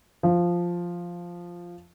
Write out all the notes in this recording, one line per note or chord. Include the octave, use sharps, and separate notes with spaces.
F3